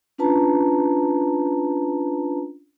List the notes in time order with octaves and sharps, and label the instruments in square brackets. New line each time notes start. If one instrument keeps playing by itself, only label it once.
[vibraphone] C#4 D4 F4 B4 A5 A#5